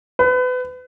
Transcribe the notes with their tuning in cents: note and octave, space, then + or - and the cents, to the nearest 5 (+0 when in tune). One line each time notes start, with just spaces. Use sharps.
B4 +30